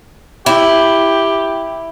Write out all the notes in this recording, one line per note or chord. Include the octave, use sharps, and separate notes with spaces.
E4 G4